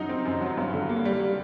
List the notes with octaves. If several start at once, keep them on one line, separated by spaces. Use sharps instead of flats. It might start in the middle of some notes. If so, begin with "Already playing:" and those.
Already playing: F#2 F#3 D#4
C4
F#2
F#3
G2
D3
A#3
G3